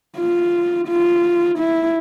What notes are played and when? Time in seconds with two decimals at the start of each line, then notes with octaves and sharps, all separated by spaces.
0.18 F4
0.88 F4
1.59 E4